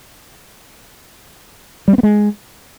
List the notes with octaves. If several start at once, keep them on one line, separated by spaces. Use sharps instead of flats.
G3
C4
B3
G#3